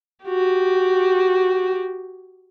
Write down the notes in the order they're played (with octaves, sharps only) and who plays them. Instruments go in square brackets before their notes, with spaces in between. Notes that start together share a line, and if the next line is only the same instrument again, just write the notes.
[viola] F#4 G4